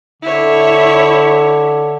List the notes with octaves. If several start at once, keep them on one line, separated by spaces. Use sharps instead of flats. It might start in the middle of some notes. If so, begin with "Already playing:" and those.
D3 E4 C#5